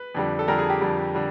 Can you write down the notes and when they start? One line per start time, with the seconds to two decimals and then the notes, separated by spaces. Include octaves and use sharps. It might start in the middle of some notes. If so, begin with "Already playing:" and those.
Already playing: B4
0.15 F2 D3 G3
0.39 A4
0.48 F2 D3 G3 A#4
0.59 G#4
0.70 G4
0.81 F2 D3 G3
1.15 D3 G3